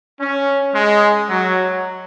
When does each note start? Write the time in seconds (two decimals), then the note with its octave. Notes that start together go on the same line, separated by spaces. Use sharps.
0.20 C#4
0.75 G#3
1.29 F#3